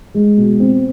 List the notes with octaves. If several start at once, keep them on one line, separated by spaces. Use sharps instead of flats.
G#3
B2
C4